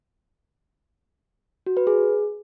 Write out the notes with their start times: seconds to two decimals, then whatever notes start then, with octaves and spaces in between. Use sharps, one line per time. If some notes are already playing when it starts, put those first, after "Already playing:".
1.66 F#4
1.77 B4
1.87 G#4